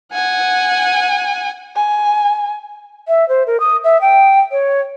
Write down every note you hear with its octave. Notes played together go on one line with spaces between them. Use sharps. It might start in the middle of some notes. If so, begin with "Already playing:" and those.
F#5 G#5
G#5
E5
C5
A#4
D#6
E5
G5
C#5